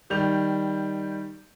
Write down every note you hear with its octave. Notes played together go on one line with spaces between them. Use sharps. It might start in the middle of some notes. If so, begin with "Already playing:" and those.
D#3 G3 G6 F7